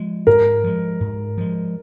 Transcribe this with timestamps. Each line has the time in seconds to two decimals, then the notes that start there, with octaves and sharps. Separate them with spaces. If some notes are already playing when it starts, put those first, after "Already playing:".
Already playing: F3 G#3
0.27 G#2 A#4
0.64 F3 G#3
1.01 G#2
1.38 F3 G#3